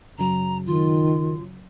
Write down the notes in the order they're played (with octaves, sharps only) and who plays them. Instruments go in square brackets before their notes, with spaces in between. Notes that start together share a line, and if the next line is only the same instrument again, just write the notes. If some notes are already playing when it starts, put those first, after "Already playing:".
[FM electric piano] F#2 C#3 F#3 [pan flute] A#5
[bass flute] D#3 [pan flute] F4